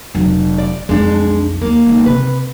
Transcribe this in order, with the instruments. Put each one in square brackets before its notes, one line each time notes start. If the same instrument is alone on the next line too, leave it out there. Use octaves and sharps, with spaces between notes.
[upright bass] F1 F#3
[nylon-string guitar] D5
[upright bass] B1 F2 [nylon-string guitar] G#3 D4
[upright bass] D#2 [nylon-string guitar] A#3
[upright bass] B1 G#3
[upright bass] C3 [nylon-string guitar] B4